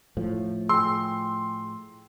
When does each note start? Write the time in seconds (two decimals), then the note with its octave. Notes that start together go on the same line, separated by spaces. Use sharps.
0.17 A2 F3
0.69 G#4 G5 C6 E6